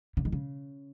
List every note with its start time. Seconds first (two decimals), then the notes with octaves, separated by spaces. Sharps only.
0.17 C#3
0.25 D#3
0.32 C#3